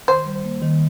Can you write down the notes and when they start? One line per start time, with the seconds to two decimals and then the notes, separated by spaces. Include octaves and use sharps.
0.08 D#3 C5
0.26 G3
0.44 A#3
0.62 D#3